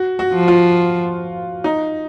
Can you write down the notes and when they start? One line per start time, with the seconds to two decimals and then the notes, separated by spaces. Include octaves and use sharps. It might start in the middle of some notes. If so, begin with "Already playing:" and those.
Already playing: F#4
0.19 F#4
0.33 F3
0.48 F4
1.64 D#4